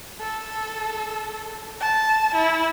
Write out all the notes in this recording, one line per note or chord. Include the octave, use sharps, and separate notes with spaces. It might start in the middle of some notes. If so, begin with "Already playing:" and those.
A4
A5
E4